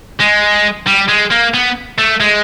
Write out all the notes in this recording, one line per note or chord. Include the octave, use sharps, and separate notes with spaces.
G#3
G3
G#3
A#3
B3
A3
G#3